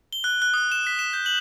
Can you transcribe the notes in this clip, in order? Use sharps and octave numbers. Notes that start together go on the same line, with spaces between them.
G7
F#6
F#6
D#6
E7
B6
E7
G6
F#7